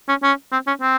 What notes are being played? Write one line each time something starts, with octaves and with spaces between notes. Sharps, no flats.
C#4
C#4
C4
C#4
C4